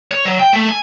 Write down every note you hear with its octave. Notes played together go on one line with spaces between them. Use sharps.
C#5
F#3
G5
A3
G#5